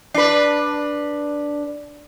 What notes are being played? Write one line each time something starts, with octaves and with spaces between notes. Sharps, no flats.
D4 B4